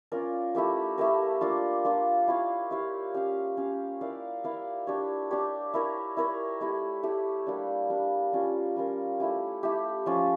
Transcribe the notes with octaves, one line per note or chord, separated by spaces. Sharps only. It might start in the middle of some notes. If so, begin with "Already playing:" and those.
C#4 F4 A#4 D5
A3 E4 G4 A#4
A3 E4 G4 A#4
A#3 D4 F4
A#3 D4 F4
E4 G4 C#5 F5
E4 G4 C#5 F5
C#4 G4 C#5 F5
C#4 G4 C#5 F5
E4 A#4 D5 F5
E4 A#4 D5 F5
D4 G4 C#5
D4 G4 C#5
E4 A#4 C#5
E4 A#4 C#5
A3 E4 G4
A3 E4 G4
G3 A#3 D4
G3 A#3 D4
G3 C#4 F4 A#4
G3 C#4 F4 A#4
A3 E4 G4
A3 E4 G4
F3 C#4 F4